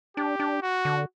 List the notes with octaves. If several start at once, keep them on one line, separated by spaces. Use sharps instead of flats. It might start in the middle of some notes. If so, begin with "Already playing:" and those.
D4 G4
D4
F#4
D3